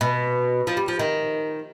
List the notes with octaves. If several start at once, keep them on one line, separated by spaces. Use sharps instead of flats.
B2
F3
G3
F3
D#3